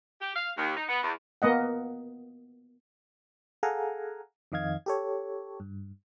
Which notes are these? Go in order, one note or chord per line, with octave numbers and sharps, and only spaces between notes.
G4
F5
D#2
D#4
B3
E2
A#3 B3 D#5 F#5
G#4 A4 F5 F#5 G#5 A#5
F2 D#3 D#5 F5 G#6
G4 A4 C#5
G2